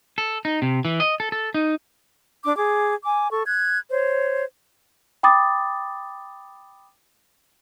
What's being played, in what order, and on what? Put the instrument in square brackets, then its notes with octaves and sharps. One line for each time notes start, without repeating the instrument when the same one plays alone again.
[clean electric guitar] A4
D#4
C3
E3
D#5
A4
A4
D#4
[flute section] D4 D6
G#4 D6
G#5 D6
A4 C#6
F#6 G#6
C5 C#5
[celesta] G5 B5 D6 D#6 A6